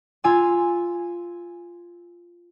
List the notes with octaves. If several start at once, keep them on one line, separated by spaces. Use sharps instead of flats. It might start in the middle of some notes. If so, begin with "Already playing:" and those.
F4 G#5 E6